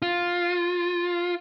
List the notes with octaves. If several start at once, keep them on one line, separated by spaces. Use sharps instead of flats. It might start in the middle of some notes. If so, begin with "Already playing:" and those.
F4